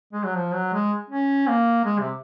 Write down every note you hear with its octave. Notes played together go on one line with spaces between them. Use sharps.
G#3
F#3
F3
F#3
G#3
C#4
A#3
G#3
C3